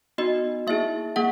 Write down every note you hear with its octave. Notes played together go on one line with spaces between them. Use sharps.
B3 D#4 F#4 D#5
A#3 E4 G#4 E5
A#3 G#4 F#5